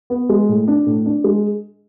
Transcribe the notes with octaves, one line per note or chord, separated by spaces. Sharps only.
B3
G#3
A2
D4
A2
D4
G#3